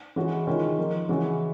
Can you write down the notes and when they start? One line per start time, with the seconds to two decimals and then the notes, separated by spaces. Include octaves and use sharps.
0.16 E3 G#3 C#4 F#4
0.47 D#3 G#3 C#4 F4
0.78 F3 A#3 D#4
1.08 C#3 E3 G#3 C#4 F#4